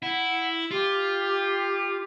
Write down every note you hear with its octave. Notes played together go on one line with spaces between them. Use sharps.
E4 F#5
F4 G4